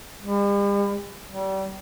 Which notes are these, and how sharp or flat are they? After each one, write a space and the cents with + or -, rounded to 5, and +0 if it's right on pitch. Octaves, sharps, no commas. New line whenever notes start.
G3 +45
G3 -30